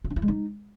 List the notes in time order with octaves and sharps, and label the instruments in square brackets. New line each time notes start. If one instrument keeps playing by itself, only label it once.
[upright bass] F4
D4
E4
G#3
D#4